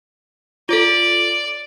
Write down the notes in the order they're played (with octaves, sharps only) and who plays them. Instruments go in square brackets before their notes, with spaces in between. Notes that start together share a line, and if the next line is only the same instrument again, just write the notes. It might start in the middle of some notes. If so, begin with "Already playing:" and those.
[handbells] F4 A4 [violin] D5